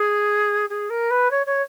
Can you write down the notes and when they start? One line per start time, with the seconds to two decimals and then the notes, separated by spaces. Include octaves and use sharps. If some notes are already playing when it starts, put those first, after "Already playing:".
Already playing: G#4
0.69 G#4
0.90 A#4
1.10 B4
1.31 C#5
1.46 C#5